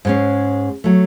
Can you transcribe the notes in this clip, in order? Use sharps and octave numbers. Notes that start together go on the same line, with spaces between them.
G#2 G#3 C#4
F#3 A3